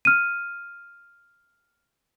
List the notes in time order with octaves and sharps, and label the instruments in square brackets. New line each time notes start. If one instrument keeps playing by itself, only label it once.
[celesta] F6 D#7